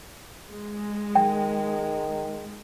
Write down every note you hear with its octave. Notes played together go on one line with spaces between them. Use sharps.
G#3
D#3 G5